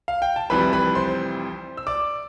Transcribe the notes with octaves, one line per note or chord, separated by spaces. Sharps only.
F5
G5
A5
F1 F2 E3 G3 B4 B5
B4 B5
C5 C6
E6
D5 D6